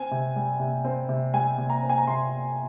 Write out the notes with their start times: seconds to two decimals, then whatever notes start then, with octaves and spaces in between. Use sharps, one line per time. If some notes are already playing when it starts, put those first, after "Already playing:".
Already playing: C4 G#5
0.11 C3
0.36 G3
0.60 C3
0.84 C4
1.09 C3
1.33 G3 G#5
1.58 C3
1.70 A#5
1.83 C4
1.89 G#5
1.98 A#5
2.07 C3 C6